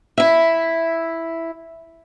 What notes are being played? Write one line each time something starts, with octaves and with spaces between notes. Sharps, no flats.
E4 E5